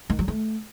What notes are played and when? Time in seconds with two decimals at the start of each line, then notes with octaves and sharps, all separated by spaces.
0.10 D#3
0.19 F#3
0.28 A3